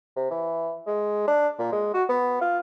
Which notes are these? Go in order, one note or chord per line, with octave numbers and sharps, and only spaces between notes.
C3
E3
G#3
D4
A#2
G#3
F#4
B3
F4